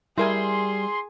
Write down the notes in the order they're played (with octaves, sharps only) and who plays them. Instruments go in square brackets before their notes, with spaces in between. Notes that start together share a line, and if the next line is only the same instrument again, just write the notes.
[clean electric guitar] G3 [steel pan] E4 A#4 G#5 [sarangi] G#4 [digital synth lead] C6